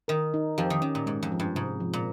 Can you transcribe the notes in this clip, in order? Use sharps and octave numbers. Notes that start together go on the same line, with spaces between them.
D#3 A#4
D#4
F2 F3 G4
D#3
D#3 C#4
A#2
G#2 G#3
F2
F3
G2
G#2 C3
F3
A#2